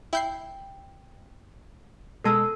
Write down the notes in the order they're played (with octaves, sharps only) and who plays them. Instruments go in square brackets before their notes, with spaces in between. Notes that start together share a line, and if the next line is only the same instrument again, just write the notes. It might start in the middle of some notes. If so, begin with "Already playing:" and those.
[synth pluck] E4 G6 C7 [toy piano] G5
[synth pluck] B2 G#3 [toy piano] A4 A5 E6